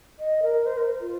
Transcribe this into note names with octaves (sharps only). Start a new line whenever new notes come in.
D#5
A#4
C5
A#4
F4